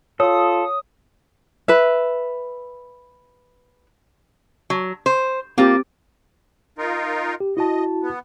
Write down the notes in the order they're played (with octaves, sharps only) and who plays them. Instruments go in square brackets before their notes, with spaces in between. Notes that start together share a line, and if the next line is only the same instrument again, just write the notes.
[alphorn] F4 [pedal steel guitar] A4 [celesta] C#5 [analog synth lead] D#6
[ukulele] B4 E5
[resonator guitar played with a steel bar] F#3
C5
[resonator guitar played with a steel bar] A#3 F4 [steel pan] C4 G4
[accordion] D#4 F4 A#4
[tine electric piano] G4
[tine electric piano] E4 F#4 A5 [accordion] D#5
[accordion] B3